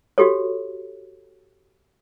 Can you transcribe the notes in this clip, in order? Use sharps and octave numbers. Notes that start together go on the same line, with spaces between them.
F#4 G4 A4 C#5